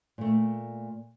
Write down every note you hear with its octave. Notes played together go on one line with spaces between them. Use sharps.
A#2 A3